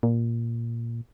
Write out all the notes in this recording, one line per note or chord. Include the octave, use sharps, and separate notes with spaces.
A#2